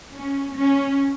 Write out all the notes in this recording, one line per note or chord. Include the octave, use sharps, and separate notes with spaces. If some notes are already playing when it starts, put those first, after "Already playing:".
C#4
C#4